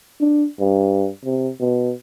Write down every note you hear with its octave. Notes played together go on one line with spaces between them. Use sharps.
D4
G2
C3
B2